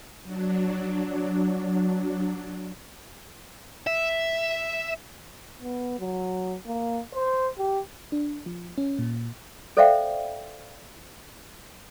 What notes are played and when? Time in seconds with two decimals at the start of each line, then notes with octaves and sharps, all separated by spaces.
0.23 F#3 D4
3.87 E5
5.59 B3
5.99 F#3
6.66 A#3
7.14 C5
7.58 G4
8.12 D4
8.46 F3
8.78 C#4
8.99 A#2
9.77 A4 C5 D5 E5 F5 G5